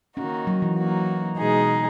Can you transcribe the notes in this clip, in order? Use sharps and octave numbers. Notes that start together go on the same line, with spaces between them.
D#3 A#3 C#4 D#4 F#4
F#3
E3
F#3 A#3 D#4 F#4
B2 G#3 D#4 G#4